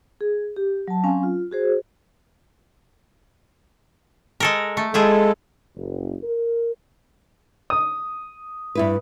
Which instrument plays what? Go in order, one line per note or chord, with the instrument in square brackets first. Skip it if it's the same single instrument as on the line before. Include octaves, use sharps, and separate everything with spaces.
[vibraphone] G#4
G4
F#3 A5
F#3 C4 C#4 F5 G#5
F4
F#4 G#4 C5
[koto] G#3 A4 A#4
A3
[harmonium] G#3 A4 [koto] E4 F4 G#4
[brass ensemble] F#1
A#4
[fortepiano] D#6
[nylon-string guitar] G2 E4 B4